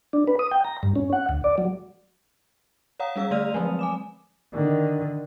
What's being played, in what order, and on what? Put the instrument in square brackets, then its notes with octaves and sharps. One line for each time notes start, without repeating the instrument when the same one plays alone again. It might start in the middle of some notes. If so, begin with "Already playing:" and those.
[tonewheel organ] D4
B4
D#6
G5
A#5
G2
C#4
F#5
D2
D5
F#3
[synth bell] C#5 F5 F#5 A#5 D#6
G3 C#4 G#4 F5 E6
D3 A3 D5 F6 D#7 F7
F3 F#3 G#3 C4
G#5 D6 E7
[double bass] D3 D#3